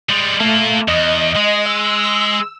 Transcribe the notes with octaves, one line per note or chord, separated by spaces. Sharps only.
G3 G#3
A3 A#3 F4
E2 D#5
G#3
E6